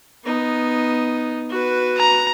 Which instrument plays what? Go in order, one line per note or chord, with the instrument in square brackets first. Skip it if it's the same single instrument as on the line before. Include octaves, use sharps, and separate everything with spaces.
[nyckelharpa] B3 D#4
F#4 B4
[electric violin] A#5